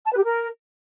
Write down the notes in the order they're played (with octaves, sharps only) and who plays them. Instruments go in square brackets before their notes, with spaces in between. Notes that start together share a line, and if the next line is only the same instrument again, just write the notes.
[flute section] A5
B4
G4
A#4